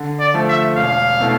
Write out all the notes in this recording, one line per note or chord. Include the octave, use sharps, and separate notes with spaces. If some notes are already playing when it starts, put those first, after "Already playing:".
Already playing: D3
D5
F3 A3
E5
E1 F5
B2 A3 E4